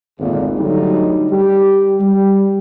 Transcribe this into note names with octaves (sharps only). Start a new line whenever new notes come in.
G#1 D2 A#2
D3 F#3 G3 A3 D#4
G3 G4
G3